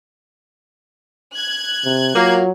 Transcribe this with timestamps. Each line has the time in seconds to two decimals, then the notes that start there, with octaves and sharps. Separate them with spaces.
1.34 F#6 G#6
1.85 C3
2.16 F#3 A#3 F4